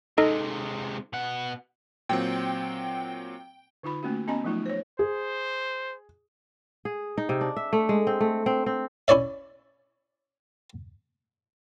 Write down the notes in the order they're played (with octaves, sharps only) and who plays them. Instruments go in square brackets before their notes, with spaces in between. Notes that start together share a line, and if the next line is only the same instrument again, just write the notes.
[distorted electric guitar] C3 G#3 [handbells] D#4 A4 D#5
[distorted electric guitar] B2 F#5
[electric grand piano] A#2 F#3 C4 [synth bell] G5
[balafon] D3 D#4 F4 B5
A3 A#3 C#4 F#4
B3 C#4 D#5 G#5 A#5 C6
F3 F#3 A3 D#4 F4
C5 C#5
[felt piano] G#4 [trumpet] C5
[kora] G#4
D#4
C3
D4
E5
A3
G#3
C4
A3
C4
C4
[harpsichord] C#4 E4 C#5 D5 E5